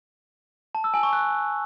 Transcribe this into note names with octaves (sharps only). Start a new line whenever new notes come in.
A5
E6
G#5
C#6
F#6